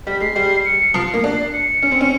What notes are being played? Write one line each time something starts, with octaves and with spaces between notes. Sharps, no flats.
G3 B6
G#3 C7
G3
C#7
F3 C7
A#3
D4
C#7
C#4
C4
C#4